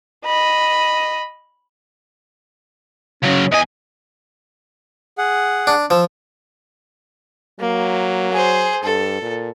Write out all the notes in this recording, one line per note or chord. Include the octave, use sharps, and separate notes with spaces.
D#5 B5
C#3 F#3 C#4
E2 D#5 G#5
G#4 F#5
D4
F3 E6
F#3 A#3
G#4 C5
G2 A4
A#2